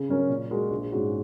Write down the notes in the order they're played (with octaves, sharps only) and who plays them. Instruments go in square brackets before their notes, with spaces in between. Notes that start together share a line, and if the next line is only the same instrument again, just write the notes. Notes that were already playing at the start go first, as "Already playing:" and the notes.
Already playing: [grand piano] C#3
F#3 C#4 A#4
A#2
G#3 F#4 A#4
A#1
G#2 G#3 C#4 F#4